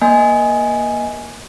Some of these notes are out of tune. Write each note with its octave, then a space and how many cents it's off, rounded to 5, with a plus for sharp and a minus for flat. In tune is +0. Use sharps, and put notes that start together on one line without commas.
A#3 +25 D#5 +0 G#5 +0